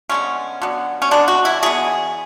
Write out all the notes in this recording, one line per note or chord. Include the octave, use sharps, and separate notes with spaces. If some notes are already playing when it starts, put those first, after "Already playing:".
D3 G#3 B3 C#4
D3 F#3 B3
C#4
D3 G#3 B3 D4
F#4
E4
E3 B3 G#4